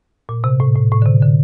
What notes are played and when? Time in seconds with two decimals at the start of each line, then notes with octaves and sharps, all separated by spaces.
0.29 A#2
0.44 C3
0.60 A2
0.75 A2
0.92 A2
1.02 D3
1.06 C3
1.22 D3